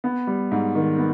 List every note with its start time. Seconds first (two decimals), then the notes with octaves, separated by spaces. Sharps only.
0.04 B3
0.27 G3
0.51 G#2
0.75 D#3
0.98 B3